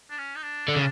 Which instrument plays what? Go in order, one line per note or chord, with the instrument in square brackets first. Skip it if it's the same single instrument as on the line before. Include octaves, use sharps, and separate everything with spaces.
[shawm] D4
C#4
D#4
D4
[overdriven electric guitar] D3 [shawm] D4
[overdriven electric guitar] C#3